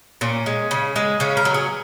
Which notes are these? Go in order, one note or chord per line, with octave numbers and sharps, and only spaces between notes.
A#2 C#4
G#3
C#3
G#3
C#3 C#4
A#4
F#3
G#4